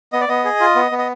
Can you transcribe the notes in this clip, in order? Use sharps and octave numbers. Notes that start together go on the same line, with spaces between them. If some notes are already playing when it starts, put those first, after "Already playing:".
B3 D#5
D5
B3 D#5
G#4
F4
B3
B3
D#5